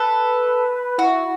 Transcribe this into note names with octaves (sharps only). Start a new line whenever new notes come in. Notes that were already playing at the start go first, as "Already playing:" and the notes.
Already playing: A4 B4
E4 F#4